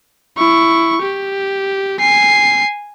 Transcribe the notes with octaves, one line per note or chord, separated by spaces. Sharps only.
E4 C#6
G4
G#5 C7